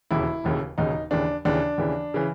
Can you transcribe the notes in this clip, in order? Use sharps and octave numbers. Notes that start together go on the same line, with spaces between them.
E1 D#2 C#3 E4
E1 D#2 C#3
E1 D#2 C#3 D#4
D#2 C#3 E3 D4
D#2 C#3 E3 D4
D#2 C#3 E3
C#3 E3